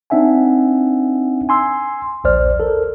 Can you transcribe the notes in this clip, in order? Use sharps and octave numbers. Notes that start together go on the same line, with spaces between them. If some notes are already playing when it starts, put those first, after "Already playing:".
C4 D4 D#4 E5 F#5 G#5
G#5 C6 E6
A#1 D#2 C5 D5 F6
A4 A#4